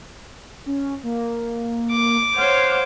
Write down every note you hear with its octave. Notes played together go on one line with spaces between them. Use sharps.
C#4
A#3
D6
C5 C#5 F5 F#5